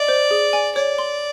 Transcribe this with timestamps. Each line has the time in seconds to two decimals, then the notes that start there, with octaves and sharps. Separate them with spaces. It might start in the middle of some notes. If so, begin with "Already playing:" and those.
Already playing: D5 D#5
0.08 C5
0.31 G#4
0.53 G#5
0.75 C#5 D5
0.98 C6